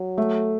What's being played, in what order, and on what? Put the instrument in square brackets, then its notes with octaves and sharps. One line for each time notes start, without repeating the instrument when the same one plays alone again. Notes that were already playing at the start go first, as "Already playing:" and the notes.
Already playing: [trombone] F#3
[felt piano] A3